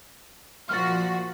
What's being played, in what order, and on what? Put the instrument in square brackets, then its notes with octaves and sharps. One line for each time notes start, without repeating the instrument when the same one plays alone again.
[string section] A#2 F3 F#4 [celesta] F6 A6